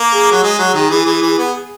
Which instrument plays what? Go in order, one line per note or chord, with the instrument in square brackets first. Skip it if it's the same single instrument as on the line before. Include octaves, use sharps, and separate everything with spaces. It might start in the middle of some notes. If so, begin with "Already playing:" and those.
Already playing: [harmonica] A#3
[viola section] G#4
[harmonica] F#3
[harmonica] G#3 [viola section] G#4
[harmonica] F#3
D#3
E3
E3
E3
B3